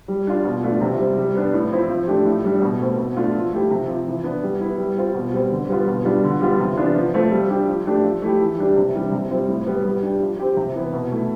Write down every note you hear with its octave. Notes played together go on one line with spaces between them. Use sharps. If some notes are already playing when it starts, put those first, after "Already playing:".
G3
D4 F4
B2
A3 D4 F4
C3
G3 C4
G3
B3 D4
A2
F3 C4 E4
F3
A3 D4 G4
A2
G3 D4
B2
A3 C4
B2
A3 D4 F4
F3
A3 E4 G4
C3
F3 C4
E3
B3 D4
G3
B3 E4
G3
C4 F4
B2
G3 C4
D3
G3 B3 F4
B2
G3 D4 F4
D3
G3 B3 F4
C3
E3 B3 D4 F4
F3
A3 C4 F4
G3
D4 G4
F3
A3 D4 G4
F3
A3 E4 G4
E3
G3 D4 G4
C3
E3 G3 D4
C3
G3 C4 F4
A2
G3 B3
G3
D4 G4
F3
C4 G4
C3
E3 B3 E4
B2
A3 E4